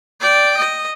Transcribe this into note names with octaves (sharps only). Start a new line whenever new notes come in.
D5 G5
D#5